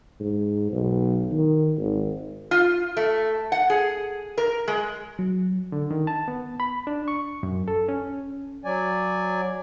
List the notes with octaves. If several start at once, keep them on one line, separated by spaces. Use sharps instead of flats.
G#2
B1
D#3
G#1
F4
A3
F#5
G#4
A#4
G#3
F#3
D3
D#3
A5
B3
B5
D4
C#6
F#2
A4
C#4
F#3 D5 G#5